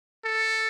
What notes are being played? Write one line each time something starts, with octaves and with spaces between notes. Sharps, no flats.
A4